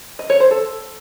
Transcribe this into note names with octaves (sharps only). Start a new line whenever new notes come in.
D#5
C#5
C5
A4